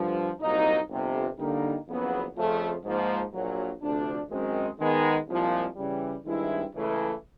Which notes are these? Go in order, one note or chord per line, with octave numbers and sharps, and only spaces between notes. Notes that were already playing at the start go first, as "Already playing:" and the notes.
Already playing: G2 D3 F3
C2 A#2 F#3 A#3 D#4
G1 F2 C3
D3 G3 A#3 D#4
F#1 F2 C#3 F#3 B3
F2 C#3 F3 A3
G#2 F3 A#3
A#1 A#2 F#3
D2 C3 F3 A3 D4
F#2 D#3 G#3 C4
D#3 G#3 B3 D#4
C2 A#2 F3 G#3
C#3 E3 G3
G2 D#3 G#3 C4 E4
C#2 C#3 E3 A3